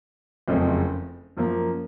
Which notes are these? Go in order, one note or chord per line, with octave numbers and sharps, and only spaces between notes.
F#1 F2 C#3 A3 C4
F#2 F3 A#3